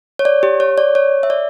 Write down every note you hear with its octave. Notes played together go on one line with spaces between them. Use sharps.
C#5
D5
G4
C#5
D5
C#5
E5
D5